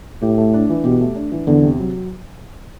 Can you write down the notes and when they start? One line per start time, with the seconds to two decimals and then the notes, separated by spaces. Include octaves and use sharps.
0.22 A2 G4
0.38 A3
0.54 D4
0.69 E3
0.85 B2 G4
1.00 A3
1.16 D4
1.32 E3
1.47 E2 D3
1.63 C3
1.79 F#3